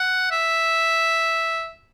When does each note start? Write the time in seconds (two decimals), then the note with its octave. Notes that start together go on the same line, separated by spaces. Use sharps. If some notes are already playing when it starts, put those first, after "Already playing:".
Already playing: F#5
0.31 E5